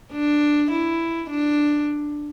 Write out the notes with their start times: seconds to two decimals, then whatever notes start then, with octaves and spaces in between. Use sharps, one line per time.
0.12 D4
0.71 E4
1.30 D4